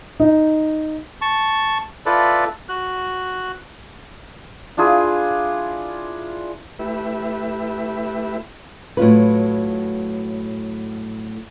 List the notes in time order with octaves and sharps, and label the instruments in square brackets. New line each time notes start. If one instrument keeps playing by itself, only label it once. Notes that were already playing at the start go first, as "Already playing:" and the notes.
[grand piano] D#4
[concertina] A5 C#6
E4 F4 A4 B4 D5
F#4 F#6
[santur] D4 E4 F4 G#4
[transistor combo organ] A3 E4 G4 B4 E5
[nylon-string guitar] A2 F#3 F4 B4